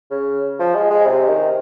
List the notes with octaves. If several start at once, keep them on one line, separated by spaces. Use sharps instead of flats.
C#3
F3
G#3
G#3
C3
D#3